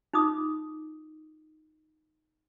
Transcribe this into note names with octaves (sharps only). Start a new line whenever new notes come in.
D#4 F4 D6 D#6